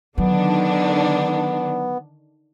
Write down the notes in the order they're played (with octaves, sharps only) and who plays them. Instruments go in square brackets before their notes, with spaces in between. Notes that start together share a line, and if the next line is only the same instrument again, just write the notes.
[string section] D3 D#3 D4 [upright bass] F#3 [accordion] B3